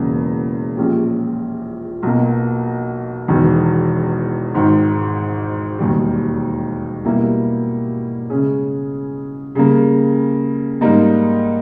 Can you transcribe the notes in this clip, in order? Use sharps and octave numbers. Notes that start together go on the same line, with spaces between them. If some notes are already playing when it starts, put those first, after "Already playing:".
Already playing: E1 E2 C#3 A#3
A#1 A#2 G#3 C#4 G4
B1 B2 A#3
E1 E2 D#3
G#1 G#2 D#3
E1 D#2 D#3 G3
B2 G3 A#3 E4 G4
C#3 G#3 C#4 G#4
C#3 G3 A#3
G#2 G3 A#3 D#4